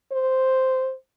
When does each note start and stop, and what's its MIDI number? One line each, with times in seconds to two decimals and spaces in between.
0.12 0.94 72